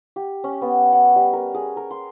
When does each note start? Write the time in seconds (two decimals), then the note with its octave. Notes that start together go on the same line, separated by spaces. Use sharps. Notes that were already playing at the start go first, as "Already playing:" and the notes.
0.16 G4
0.44 C#4
0.62 B3
0.92 F#5
1.16 G3
1.33 A#4
1.54 G#4
1.77 A#4
1.91 C6